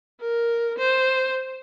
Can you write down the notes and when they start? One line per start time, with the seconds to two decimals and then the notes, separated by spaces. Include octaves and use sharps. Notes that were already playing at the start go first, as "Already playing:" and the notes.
0.21 A#4
0.78 C5